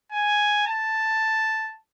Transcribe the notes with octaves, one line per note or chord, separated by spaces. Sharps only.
G#5
A5